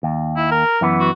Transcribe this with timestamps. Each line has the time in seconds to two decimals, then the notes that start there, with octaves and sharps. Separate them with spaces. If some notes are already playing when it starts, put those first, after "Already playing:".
0.03 D#2
0.37 E4
0.51 A#4
0.81 F#2 E3 B3
1.00 F#4